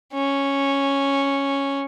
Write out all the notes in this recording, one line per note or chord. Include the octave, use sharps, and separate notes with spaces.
C#4